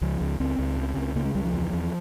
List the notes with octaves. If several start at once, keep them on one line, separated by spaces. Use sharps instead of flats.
C#2 F3
C#2
C#2 C4
C#2
C#3
C#2
C#3 A#3
G#3
C#2 G3
F3
E2
E2